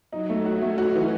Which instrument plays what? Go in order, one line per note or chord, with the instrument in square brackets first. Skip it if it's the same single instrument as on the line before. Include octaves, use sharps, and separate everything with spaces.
[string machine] F#3 [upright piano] D#4
[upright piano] A3
F#4
[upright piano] A3 [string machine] C#4
[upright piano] F#4
E3